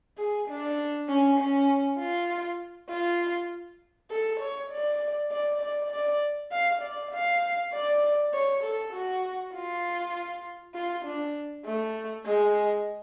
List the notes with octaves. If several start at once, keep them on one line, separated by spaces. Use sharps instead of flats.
G#4
D4
C#4
C#4
F4
F4
A4
C#5
D5
D5
D5
D5
F5
D5
F5
D5
C#5
A4
F#4
F4
F4
D4
A3
G#3